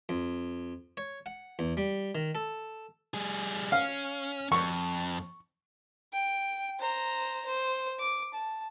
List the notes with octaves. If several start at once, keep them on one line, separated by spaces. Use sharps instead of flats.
F2
C#5
F#5
E2
G3
D#3
A4
G3 G#4
C#4 F5
F2 C#6
G5
C5 A#5
C5
D6
A5